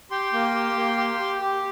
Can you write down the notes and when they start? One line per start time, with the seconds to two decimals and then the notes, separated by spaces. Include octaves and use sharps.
0.11 G4 G5 C6
0.33 A#3
0.54 G4
0.76 A#3
0.98 G4
1.19 G4
1.41 G4